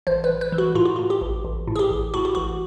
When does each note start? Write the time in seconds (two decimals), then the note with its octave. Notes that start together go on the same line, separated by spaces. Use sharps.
0.07 A1 C5
0.24 B4
0.29 A1
0.41 B4
0.52 E3
0.58 F#4
0.75 A2 F4
0.85 F#4
0.96 A2 F4
1.10 G4
1.21 A1
1.45 A1
1.68 A2
1.76 G#4
1.79 G4
1.91 A1
2.14 A2 F#4
2.25 G4
2.35 A1 F#4